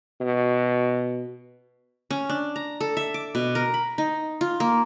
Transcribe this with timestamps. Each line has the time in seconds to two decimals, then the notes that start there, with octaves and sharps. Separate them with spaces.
0.21 B2
2.11 C#4
2.29 D4
2.56 A#5
2.81 A4
2.97 E5
3.14 D6
3.35 B2
3.55 A#4
3.74 B5
3.98 D#4
4.41 F4
4.60 A#3